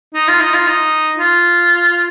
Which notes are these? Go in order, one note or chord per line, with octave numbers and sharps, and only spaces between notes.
D#4
F4
D#4
F4
D#4
F4